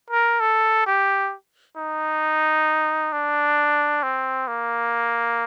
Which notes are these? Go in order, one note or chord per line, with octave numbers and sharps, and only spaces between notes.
A#4
A4
G4
D#4
D4
C4
A#3